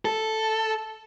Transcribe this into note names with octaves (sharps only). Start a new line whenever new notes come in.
A4